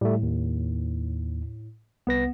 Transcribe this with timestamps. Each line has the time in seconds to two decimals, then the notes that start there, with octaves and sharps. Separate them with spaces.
0.01 A2 G3 A3
0.22 D#2
2.07 C2 B3 B4 A#6